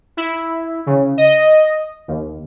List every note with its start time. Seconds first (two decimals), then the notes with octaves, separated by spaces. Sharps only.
0.17 E4
0.86 C#3
1.18 D#5
2.08 D#2